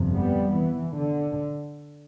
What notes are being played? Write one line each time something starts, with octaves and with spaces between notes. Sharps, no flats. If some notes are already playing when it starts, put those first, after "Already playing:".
Already playing: G1 F2 C3
G3 B3
E3
D3